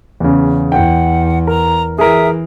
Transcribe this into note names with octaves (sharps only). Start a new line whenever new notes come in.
E2 C#3
E2 F#5 G5
A#4 A#5
E3 G#4 A#4 E5 D#6